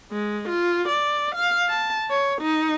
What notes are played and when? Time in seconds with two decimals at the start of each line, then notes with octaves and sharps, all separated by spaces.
0.12 G#3
0.49 F4
0.89 D5
1.35 F5
1.68 A5
2.10 C#5
2.41 D#4